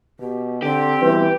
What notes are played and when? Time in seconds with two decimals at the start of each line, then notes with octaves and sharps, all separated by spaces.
0.20 B2 G4
0.62 D3 C4 G4
1.01 B2 E3 G3 B4